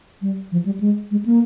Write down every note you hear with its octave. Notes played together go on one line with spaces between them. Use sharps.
G3
F3
G3
G#3
G#3
A#3